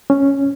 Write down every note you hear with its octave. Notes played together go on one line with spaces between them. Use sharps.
C#4